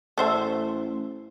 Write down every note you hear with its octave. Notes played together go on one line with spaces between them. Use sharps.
A1 A3 C5 E5